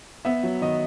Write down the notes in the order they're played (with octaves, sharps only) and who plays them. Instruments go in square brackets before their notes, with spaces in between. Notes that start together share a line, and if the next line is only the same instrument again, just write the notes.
[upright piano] B3 E5
F#3
D#3 D#5